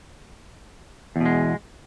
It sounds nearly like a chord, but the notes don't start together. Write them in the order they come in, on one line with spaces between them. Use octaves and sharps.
E2 B2 G#3